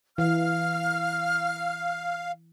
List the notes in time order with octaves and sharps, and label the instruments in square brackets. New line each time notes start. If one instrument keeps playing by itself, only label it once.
[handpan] E3 [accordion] F5 [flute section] F6